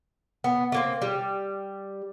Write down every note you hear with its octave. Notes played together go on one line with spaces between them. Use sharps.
B3
A3 A#3 C4
G3